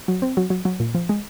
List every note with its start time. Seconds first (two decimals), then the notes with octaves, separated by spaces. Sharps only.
0.08 F#3
0.22 C4
0.37 F#3
0.50 F#3
0.65 F#3
0.80 A#2
0.95 F3
1.09 G#3